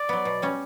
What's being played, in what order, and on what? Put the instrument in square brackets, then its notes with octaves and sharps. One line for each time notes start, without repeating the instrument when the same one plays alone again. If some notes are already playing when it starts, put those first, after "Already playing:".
Already playing: [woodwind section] D5
[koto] F#3 B3
B2
G3 C#4